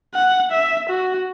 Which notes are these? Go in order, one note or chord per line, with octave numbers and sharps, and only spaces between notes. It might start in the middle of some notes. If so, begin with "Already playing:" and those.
F#5
E5
F#4